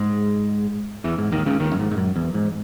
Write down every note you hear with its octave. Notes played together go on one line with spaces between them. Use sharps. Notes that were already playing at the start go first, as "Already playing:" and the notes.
Already playing: G#2 G#3
E2 E3
G#2
D#2 D#3
C#2 C#3
D#2 D#3
F#2
G#2
G#2
F#2
E2
G#2